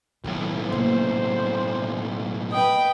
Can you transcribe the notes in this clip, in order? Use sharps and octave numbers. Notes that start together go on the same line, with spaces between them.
B1 A2 D#3 F#3
C3 A#3 C5
B4 D#5 G5